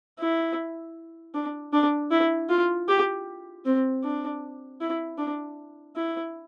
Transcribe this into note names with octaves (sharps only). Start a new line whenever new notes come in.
E4
D4
D4
E4
F4
G4
C4
D4
E4
D4
E4